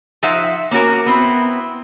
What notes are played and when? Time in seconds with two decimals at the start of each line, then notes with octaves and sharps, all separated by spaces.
0.23 F3 D#4 E5 F#5
0.71 A#3 C#4 F#4 A#4
1.06 B3 C4 E4